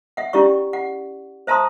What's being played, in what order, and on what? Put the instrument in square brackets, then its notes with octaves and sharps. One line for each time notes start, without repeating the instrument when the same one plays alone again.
[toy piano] E5 F#5
C#4 E4 G4 D5 C#6
F#5
C5 E5 A5 A#5 C6 D#6